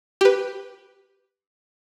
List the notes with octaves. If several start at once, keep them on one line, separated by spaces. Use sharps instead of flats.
G4 B4